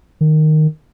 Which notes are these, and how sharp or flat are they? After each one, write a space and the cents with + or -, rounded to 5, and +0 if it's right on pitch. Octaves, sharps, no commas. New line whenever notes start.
D#3 -10